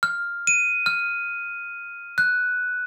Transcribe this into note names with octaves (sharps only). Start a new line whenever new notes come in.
F6
D#7
F6
F#6